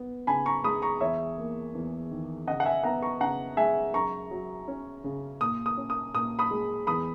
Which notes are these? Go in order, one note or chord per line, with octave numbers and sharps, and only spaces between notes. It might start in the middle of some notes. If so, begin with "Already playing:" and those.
Already playing: B3
C#3 G#5 B5
A#5 C#6
G#3 B5 D#6
A#5 C#6
E2 C#5 E5
A#3
E2
D#3
C#3 D#5 F#5
F#5
E5 G#5
B3 F#5 A#5
A#5 C#6
C#3 F#5 A#5
G#3 E5 G#5
F#2 A#5 C#6
F#3
C#4
C#3
A#2 D#6
D#6
C#4
D#6
A#2 D#6
B5 D#6
G#3
E2 B5 D#6